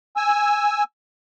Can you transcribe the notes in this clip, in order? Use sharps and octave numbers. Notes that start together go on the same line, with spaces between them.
G#5 E6